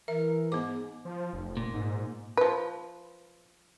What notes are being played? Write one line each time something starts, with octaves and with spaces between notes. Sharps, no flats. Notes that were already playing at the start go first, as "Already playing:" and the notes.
E3 A#4 E5
G#2 B3 D6
F3
F1
A#2
G#2
F3 B4